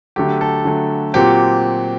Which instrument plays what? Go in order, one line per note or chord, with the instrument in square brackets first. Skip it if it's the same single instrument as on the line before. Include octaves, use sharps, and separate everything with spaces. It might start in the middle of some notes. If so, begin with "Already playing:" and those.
[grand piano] D3 F#3 A3 G4
A4
D3 F#3 A3
A#2 F#3 C4 G4